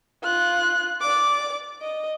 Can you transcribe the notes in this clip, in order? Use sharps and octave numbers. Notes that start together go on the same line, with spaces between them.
F4 F#6
D5 D6
D#5